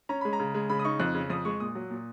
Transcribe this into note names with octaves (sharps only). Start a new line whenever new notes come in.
C#4 A#5
G#3 B5
A#5
C#3
G#3
C#3 B5
D#6
D#4 C#6
F2 F#6
C#3
F2 D#6
G#3 C#6
A#2 D#6
F#3
A#2